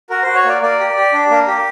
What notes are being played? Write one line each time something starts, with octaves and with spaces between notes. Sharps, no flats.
F#4 A#4
F#4 C5
C#5
A#3 D5
A#3 D5
G4
G4
D4
A#3
G4